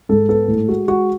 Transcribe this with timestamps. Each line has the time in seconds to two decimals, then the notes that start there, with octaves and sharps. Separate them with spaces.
0.09 G#2 A4
0.29 B3 A4
0.48 A2
0.68 G#3 F#4
0.88 G#3 F#4